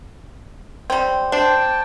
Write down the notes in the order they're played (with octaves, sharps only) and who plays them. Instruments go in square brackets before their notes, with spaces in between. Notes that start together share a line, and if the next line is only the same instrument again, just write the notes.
[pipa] G3 C4
[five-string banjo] D4 C5 [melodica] G5 A5